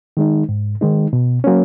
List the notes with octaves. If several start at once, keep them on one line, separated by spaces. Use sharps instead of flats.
D#3 G#3 D#4
G#2
D#3 G#3 D#4
B2
F#3 A#3 C#4